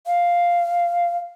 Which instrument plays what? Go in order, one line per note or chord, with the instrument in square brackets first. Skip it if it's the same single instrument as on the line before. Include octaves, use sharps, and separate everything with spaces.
[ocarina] F5